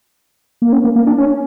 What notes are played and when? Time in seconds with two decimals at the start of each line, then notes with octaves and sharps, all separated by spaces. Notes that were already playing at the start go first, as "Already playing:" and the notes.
0.62 A#3
0.73 C#4
0.84 A#3
0.96 A#3
1.07 D4
1.18 C#4